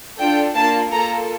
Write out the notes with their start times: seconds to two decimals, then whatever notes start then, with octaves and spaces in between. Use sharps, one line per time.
0.20 D4 F4 A4 G5
0.55 A#3 D4 F4 A5
0.92 A#3 F4 A4 A#5